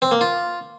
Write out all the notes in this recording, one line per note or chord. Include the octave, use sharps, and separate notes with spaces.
C4
A#3
F4